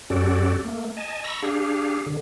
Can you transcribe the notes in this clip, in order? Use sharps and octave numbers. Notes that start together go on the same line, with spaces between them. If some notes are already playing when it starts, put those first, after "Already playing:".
F#2 C#4 F#4 G4 A4 D5
A3 A#3
D#5 G#5 A5
A#5 B5 C#6 E6 A#6
D4 G4 G#4 F5
D3